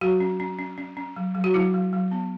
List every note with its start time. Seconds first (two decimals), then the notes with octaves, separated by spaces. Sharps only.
0.01 F#3 F#4
0.20 C#4
0.40 C#4
0.59 C#4
0.78 C#4
0.97 C#4
1.16 F#3
1.35 F#3
1.44 F#4
1.54 F#3 E4
1.74 F#3
1.93 F#3
2.11 B3